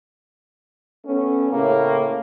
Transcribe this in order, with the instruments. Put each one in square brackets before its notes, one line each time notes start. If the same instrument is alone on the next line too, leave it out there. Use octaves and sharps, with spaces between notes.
[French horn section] A3 B3 C#4
[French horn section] A2 C#3 [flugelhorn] A#3